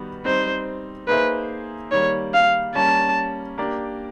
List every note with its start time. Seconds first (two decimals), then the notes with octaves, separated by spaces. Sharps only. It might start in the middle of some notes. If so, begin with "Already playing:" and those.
Already playing: D#3 G3 B3 F#4
0.25 G3 C4 D#4 C5
1.08 A#3 D#4 G#4 B4 C5 E5
1.91 D#3 G3 A#3 C#5
2.34 F5
2.75 G3 A#3 C#4 A5
3.58 A#3 D4 G4 A#4 D5